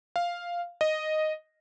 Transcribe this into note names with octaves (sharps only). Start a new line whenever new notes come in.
F5
D#5